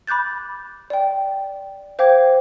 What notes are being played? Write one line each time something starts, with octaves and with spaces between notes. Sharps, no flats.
B5 D6 F#6 G6 A6
D5 G5
C5 F5 G5 D6 G#6